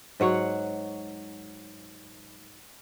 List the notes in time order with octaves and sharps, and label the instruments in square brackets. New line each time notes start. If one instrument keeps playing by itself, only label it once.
[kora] G#2 F#3 C#5 F#5